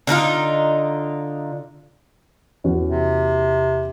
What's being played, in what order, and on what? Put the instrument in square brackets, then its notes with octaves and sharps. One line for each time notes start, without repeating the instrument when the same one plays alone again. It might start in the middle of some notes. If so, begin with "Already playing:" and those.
[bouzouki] D3 D4 D#4 F4
[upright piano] E2 C#4 F#4
[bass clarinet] C3